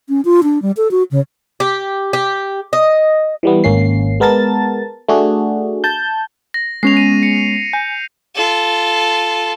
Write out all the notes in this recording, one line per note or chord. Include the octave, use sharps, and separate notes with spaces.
C#4
F4
D4
G3
A4
F#4
C#3
G4
G4
D#5
E3 G3 B3
G#1 A#3 C#4 C7
G#3 B3 A#4 A5 A6
A3 D4 F#4 G#4
A5 G6
A#6
G#3 B3 C#4 C7 F7
D#7
C#7
G#5 G6
F4 A4